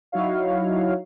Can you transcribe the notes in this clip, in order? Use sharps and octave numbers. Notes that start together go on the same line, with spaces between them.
F#3 D#4 E4 F#4 C#5 F5